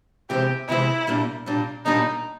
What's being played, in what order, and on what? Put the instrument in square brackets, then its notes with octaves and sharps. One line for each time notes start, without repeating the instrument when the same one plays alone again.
[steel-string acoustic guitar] C3 E3 G#3 C4 [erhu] G4
[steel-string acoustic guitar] C3 E3 G#3 C4 [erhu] E4
[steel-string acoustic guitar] A#2 G3 A#3 D4
A#2 G3 A#3 D4
[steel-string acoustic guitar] A#2 G3 A#3 D4 [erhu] D#4